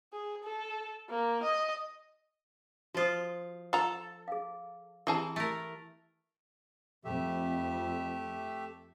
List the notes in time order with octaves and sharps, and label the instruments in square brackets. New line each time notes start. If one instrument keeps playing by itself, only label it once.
[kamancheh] G#4
A4
A#3
D#5
[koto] F3 F4 [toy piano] F#4 C5 D#6
[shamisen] F4 A#5 [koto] A4
[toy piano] G#4 F5
[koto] E3 [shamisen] C4 G#4 A5 [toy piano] E4 G4
[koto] A3 A#4
[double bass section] F2 [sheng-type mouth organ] A3 G4 E5